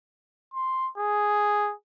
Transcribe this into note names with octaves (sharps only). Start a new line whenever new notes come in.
C6
G#4